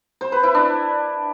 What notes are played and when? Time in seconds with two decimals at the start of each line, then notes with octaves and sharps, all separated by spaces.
0.21 C5
0.32 B4
0.43 E4
0.55 D4